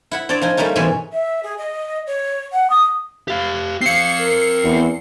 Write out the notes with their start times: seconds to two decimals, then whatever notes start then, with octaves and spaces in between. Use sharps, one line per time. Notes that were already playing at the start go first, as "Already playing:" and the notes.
0.11 E4 F#5 B5
0.29 C4 D4 C#5 D5
0.41 F3 D#4 G#5
0.57 G3 A3 A#3 C#4 D#4
0.76 G#2 B2 E3 C4 C#5 G#5
1.13 E5
1.43 G#4
1.58 D#5
2.07 C#5
2.53 F#5
2.70 D#6
3.28 G4 F5
3.81 C4 F5 C7 C#7
4.20 A#4
4.63 E2